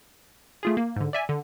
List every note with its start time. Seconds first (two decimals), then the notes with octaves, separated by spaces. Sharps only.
0.63 A3 F4 G#4
0.77 A#3
0.96 G#2 D3
1.13 D5 E5 G#5
1.29 D3